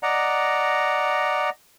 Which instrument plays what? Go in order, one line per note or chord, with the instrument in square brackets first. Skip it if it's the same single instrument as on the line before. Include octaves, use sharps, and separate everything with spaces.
[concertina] D5 D#5 F#5 A#5